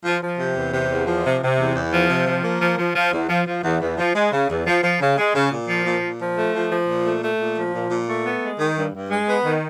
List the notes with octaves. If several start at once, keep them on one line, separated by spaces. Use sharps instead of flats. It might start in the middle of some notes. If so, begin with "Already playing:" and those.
F3
F3
C3
E2
C3
E2
F3
C3
C3
E2
E2
F3
C3
F3
A#3
F3
F3
F3
E2
F3
F3
E2
E2
F3
G#3
C#3
E2
F3
F3
C#3
G#3
C#3
A#2
F3
A#2
A#2
F3
A3
F3
F3
A#2
A3
A3
A#2
F3
A#2
A#2
A3
B3
G#3
D#3
G2
G2
G#3
B3
D#3